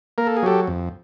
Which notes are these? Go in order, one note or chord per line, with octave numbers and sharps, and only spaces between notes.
A#3 A#4
A4
G#4
F#3 G4 A4
F2